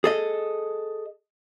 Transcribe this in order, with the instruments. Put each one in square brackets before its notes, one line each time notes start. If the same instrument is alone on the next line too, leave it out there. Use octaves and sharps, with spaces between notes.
[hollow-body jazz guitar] G#4 A4 D#5